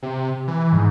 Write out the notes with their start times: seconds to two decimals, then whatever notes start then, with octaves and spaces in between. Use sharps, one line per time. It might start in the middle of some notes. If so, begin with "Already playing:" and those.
0.03 C3
0.47 E3
0.72 G#2